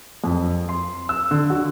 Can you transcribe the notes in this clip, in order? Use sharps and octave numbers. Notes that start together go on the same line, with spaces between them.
F2
C6
E6
D3
F#4